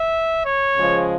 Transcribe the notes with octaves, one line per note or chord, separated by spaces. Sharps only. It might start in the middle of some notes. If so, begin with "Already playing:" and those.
Already playing: E5
C#5
C#3 F3 G#3